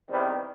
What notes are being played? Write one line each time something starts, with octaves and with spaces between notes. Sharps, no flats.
E2 C3 D#3 G3 C4 B4